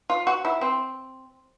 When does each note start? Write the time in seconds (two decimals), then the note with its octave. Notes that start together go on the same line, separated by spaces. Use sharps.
0.10 F4
0.27 F#4
0.45 E4
0.61 C4